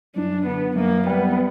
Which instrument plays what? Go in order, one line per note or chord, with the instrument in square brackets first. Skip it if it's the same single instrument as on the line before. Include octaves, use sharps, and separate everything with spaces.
[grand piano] F#2 [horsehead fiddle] D4
[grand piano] D3 [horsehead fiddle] B3
[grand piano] F#2 [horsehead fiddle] A#3
[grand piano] G3 [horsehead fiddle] B3